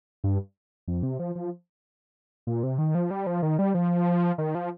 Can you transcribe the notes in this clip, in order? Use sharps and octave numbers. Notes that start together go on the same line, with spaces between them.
G2
F2
C3
F3
F3
A#2
C3
D#3
F3
G3
F3
D#3
G3
F3
D#3
F3